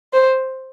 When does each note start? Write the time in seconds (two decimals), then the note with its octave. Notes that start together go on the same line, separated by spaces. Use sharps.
0.13 C5